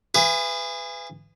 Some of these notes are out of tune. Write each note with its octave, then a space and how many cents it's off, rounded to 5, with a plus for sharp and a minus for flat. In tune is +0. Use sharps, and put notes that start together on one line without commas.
G#4 -20 B4 +20 E5 +40